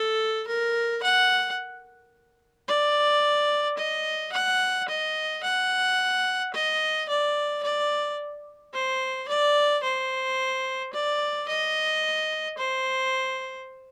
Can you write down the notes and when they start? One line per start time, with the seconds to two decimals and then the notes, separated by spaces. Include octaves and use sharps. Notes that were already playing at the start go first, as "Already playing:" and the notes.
Already playing: A4
0.47 A#4
1.03 F#5
2.68 D5
3.77 D#5
4.33 F#5
4.88 D#5
5.43 F#5
6.54 D#5
7.09 D5
7.63 D5
8.74 C5
9.28 D5
9.83 C5
10.93 D5
11.48 D#5
12.58 C5